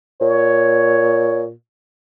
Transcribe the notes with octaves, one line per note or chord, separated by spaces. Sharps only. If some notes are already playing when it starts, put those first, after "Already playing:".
A#2 C#5